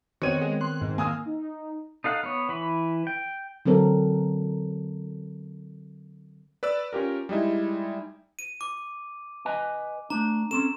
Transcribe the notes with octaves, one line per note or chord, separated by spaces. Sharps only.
D#3 B3 C4 F#4 C#5 D#7
G#3
C6 F#6
G#2
A#3 F5 G#5 D#6 E6
D#4
D#4 A4 F5 F#5
B3 C#5
E3 B5
G5
D3 F#3 C4 A4 A#4
B4 D5 E6
C#4 F4 G4 A#4
G3 G#3 D#4 E4
D#7
D6
B4 D#5 G#5
A3 D4 A#5
C4 C#4 A4 E7